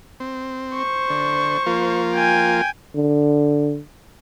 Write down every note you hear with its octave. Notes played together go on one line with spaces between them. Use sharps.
C4
C5 C#6
D3
F3 A#3 F4
G5 G#5
D3